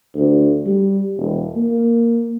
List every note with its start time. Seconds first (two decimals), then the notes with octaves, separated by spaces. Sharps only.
0.15 D2
0.66 G3
1.17 E1
1.56 A#3